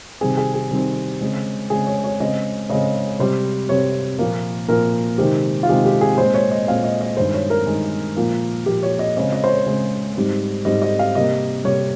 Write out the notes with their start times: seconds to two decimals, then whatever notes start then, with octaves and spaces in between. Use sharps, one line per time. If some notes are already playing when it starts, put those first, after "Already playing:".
0.21 C3 D#3 G3 C4 G#4
0.37 G#4
0.54 G#4
0.71 C3 D#3 G3 C4
1.21 C#3 G#3 C4
1.70 C#3 G#3 C4 G#4
1.87 C#5
2.04 C#5
2.20 C#3 G#3 C4 D#5
2.69 C#3 G#3 C4 D#5
3.19 C3 G3 C4 C5
3.69 C3 G3 C4 C#5
4.19 A#2 F3 A#3
4.69 A#2 F3 A#3 A#4
5.18 C3 D#3 G#3 C4 G4
5.63 F4
5.69 C3 D#3 G#3 C4 G4
5.85 G4
6.01 G#4
6.18 A#2 G#3 C4 C5
6.34 C#5
6.51 D#5
6.68 A#2 G#3 C4 F5
6.84 D#5
7.01 D#5
7.17 G2 D#3 G#3 C5
7.34 C#5
7.50 A#4
7.67 G2 D#3 G#3
8.17 A#2 F3 A#3
8.66 A#2 F3 A#3 G4
8.83 C#5
8.99 D#5
9.17 C#3 G#3 C4 D#5
9.33 D#5
9.44 C5
9.49 C#5
9.66 C#3 G#3 C4
10.15 G#2 G3 C4
10.65 G#2 G3 C4 D#5
10.82 D#5
10.99 F5
11.15 C3 G3 A#3 D#5
11.65 C3 G3 A#3 C#5